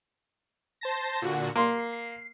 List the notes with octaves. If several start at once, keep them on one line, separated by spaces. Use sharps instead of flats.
C5 A5 A#6
A#2 D3 F#4
A#3 C6 C7